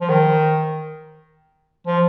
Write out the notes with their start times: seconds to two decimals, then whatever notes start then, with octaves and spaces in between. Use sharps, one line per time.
0.01 F3
0.10 D#3
1.87 F3